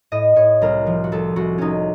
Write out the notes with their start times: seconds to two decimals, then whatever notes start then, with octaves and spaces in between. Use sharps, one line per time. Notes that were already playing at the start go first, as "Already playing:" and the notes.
0.12 A2 D#5
0.36 A2 C#5
0.62 C2 A#4
0.86 F3
1.04 F#4
1.12 C2 A4
1.36 C2 F#4
1.58 C2 C#4 D#4